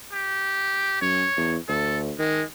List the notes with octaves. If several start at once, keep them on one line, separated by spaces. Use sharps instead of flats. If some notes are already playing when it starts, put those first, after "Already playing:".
G4
F#2 C#5
E2
D2 A4
D#3 G#3